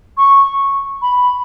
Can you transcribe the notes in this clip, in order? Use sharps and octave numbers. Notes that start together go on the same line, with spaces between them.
C#6
B5